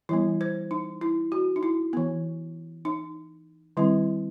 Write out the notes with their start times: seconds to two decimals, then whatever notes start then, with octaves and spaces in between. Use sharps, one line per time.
0.09 E3 G3 B3 E4
0.41 C5
0.71 D#4
1.01 E4
1.32 F#4
1.56 D#4
1.63 E4
1.93 E3 B3
2.85 D#4
3.77 D#3 G3 C4 E4